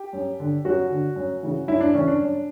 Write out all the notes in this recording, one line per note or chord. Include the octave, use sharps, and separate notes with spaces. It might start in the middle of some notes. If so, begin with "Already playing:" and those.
Already playing: G4
F#2
D3
F#2 F#4
D3
F#2
C#3 E3
F#2 E4
D4
C#3 E3 C#4
D4
F#2